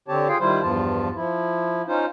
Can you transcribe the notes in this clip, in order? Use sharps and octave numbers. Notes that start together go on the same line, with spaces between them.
D3 C4 G4 C#5 A5
F4 G#4 F5 G5
D#3 G3 E4 F4 C5
E2 G2 F3 F4 A5
F3 E4
C#4 D#4 F4 C5